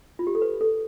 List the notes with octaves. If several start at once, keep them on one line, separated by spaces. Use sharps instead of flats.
F4
G4
A4
B4
A4